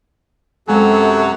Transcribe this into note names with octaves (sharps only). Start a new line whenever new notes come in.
F#2 C3 F#3 G#3 A4 G#5